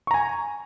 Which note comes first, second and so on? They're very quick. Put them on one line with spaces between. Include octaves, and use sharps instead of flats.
C#6 A#5 G#5